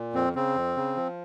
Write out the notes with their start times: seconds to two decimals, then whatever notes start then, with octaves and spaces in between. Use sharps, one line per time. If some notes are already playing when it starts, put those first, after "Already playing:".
Already playing: A#2
0.13 F2 C4
0.35 C#3 C4
0.55 F2
0.76 C#3
0.96 F3